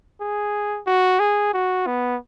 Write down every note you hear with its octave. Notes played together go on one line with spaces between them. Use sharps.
G#4
F#4
G#4
F#4
B3